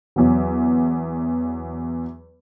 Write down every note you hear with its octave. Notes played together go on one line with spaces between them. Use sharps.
E2 F#3